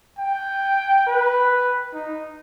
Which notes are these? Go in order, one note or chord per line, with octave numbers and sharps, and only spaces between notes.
G5
B4
D#4